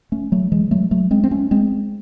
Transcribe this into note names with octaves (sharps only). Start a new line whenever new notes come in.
A3 C#4
F#3 A3
E3 G#3
F#3 A3
F#3 A3
G#3 C4
C4
A3 C#4
G#3 C4